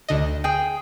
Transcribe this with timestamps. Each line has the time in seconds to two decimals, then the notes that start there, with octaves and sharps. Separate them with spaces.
0.08 D2 D3 D#5
0.44 G#4 G5